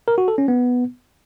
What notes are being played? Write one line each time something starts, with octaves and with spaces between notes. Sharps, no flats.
A#4
F#4
A4
C#4
B3